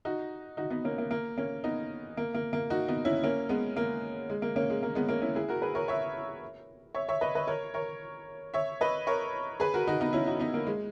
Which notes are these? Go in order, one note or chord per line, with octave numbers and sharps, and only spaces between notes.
D#4 F#4
D#4 F#4
B3 D#4
A#3 C#4
A#3
A#3
A#3 C#4
B3 D#4
A#3
A#3
A#3
D#4 F#4
B3 D#4
C#4 E4
A#3 C#4
G#3 B3
A#3
G#3
A#3
A#3 C#4
G#3
A#3
G#3 B3
A#3 C#4
C#4 E4
E4 G#4
F#4 A#4
G#4 B4
A#4 C#5
C#5 E5
C#5 E5
C#5 E5
B4 D#5
B4 D#5
A#4 C#5
A#4 C#5
C#5 E5
B4 D#5
A#4 C#5
G#4 B4
F#4 A#4
D#4 F#4
B3 D#4
C#4 E4
D#4 F#4
B3 D#4
A#3
G#3